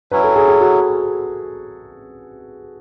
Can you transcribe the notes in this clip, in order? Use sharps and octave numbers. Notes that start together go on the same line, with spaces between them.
F#3 C#4 E4 B4
A4
G#4
G#4
F#4